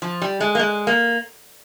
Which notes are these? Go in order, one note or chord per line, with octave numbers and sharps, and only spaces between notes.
F3
G3
G#3
A#3
G#3
A#3